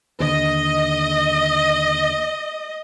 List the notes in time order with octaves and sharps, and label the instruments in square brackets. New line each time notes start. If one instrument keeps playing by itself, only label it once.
[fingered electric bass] D#2 D3 [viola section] D#5